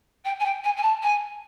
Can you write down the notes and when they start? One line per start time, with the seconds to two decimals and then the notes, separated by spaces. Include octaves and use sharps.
0.24 G5
0.39 G#5
0.44 G5
0.63 G#5
0.76 G#5
0.82 A5
1.02 G#5